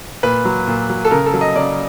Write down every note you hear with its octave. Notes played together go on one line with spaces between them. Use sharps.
A#2 B4
F#3
A#2
F#3
A4
C#3 A#4
A4
F#3
D#5
C#3 D5